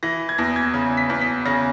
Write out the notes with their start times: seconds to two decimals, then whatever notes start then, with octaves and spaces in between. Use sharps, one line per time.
0.03 E3 A#6
0.29 G#6
0.38 E2 A#6
0.56 G#6
0.74 C#3
0.97 B6
1.10 E2
1.21 B6
1.45 C#3 A#6